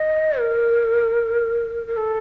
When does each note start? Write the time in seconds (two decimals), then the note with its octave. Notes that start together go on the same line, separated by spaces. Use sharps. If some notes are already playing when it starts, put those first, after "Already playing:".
Already playing: D#5
0.39 A#4
1.87 A#4
1.97 A4